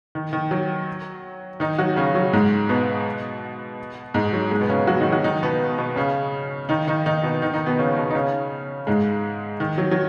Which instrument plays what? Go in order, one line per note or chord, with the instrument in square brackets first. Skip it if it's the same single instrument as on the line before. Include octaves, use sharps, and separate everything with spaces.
[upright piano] D#3
D#3
F#3
D#3 D#4
F#3 F#4
C#3 C#4
F#3
G#2 G#3
B2 B3
G#2 G#3
F#3
G#2 G#3
B2 B3
C#3 C#4
F#3 F#4
D#3 D#4
F#3 F#4
D#3 D#4
B2 B3
B2 B3
C#3 C#4
D#3 D#4
D#3 D#4
D#3 D#4
B2 B3
D#3 D#4
D#3 D#4
B2 B3
C#3 C#4
B2 B3
D#4
C#3 C#4
G#2 G#3
D#3
F#3
F#3